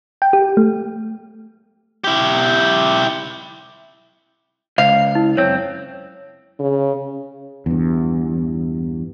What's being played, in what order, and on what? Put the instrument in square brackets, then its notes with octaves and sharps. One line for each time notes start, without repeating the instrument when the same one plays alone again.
[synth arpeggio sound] G5
G4
A3
[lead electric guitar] E4 G4
[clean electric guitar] C#2 [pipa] F5
[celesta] E4
[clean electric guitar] F#2 C4 [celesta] C#5
[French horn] C#3
[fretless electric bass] E2 G2